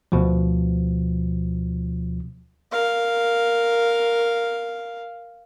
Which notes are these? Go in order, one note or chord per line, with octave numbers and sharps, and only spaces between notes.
D2 B2 F3
A#4 F5